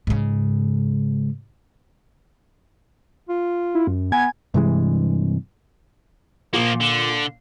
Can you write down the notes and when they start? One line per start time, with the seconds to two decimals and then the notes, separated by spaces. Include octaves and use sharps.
0.07 G#2 C#3
3.29 F4
3.75 E4
3.87 F#2
4.12 B3 G#5 G#6
4.54 G2 C3 E3 G#3
6.53 A#2 F3 A#3
6.81 D3